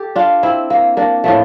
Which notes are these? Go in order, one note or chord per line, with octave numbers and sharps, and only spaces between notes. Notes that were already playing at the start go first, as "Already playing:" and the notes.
Already playing: G4 A4
D4 F4
C4 E4
A#3
A#3 D4
A2 F3 A3